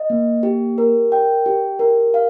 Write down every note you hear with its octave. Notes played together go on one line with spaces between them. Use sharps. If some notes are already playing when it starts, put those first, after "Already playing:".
Already playing: D#5
A#3
G4
A#4
G5
G4
A#4
F5